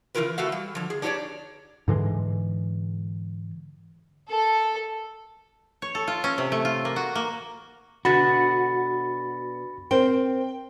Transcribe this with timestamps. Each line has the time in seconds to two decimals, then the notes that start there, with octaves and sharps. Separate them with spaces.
0.15 C#3 E3 F#3 F4 A#4 B4
0.38 E3 A3 F#4 E5 F5
0.52 G3
0.75 D3 F3
0.90 G#4
1.02 D4 D#4 G4 A#4 C#5 D5
1.88 G#2 D3 E3 G#3
4.29 A4
5.82 C#5
5.95 A4
6.08 F4
6.24 C#4
6.38 C3
6.52 A3
6.65 F4
6.85 A#3
6.96 F#4
7.15 A#3
8.05 B2 D3 B3 F#4 B5 A6
9.91 C4 A#4 C5 G5